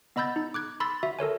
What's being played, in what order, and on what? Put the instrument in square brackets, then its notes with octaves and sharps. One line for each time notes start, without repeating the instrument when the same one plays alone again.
[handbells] B3 D#5 B5 E6 G6 A6
D#4
D6 F#6 G#6
B5 C6 E6 A6
F#4 E5
A4 A#4 C#5 G#5